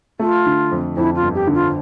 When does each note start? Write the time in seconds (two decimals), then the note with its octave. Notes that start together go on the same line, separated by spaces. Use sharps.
0.19 A3 F4
0.46 D3
0.71 F2
0.97 F2 E4
1.15 F4
1.22 G1
1.34 G4
1.47 D3
1.54 F4